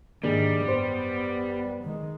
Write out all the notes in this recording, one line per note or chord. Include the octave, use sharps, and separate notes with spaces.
G#2 D#3 G3 A#3 D4 G#4
F#2 B3 G4 C5
D#3 G#3